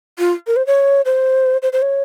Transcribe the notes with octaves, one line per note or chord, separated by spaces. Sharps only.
F4
A#4
C5
C#5
C5
C5
C5
C#5